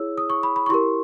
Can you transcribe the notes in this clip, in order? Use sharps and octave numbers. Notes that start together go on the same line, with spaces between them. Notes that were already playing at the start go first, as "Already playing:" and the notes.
Already playing: E4 G#4 C#5 E6
D#6
C#6
B5
B5
C#6
E4 G4 A#4 C6